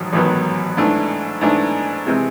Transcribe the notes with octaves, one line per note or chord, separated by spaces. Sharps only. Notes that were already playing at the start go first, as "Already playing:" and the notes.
Already playing: A1 G#2 D#3 F#3
A1 G#2 D#3 F#3 B3
G#2 E3 A3 D4
G#2 E3 A3 D4
C3 E3 G#3 C4